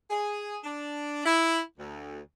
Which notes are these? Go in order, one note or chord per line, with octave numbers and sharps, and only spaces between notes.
G#4
D4
E4
D2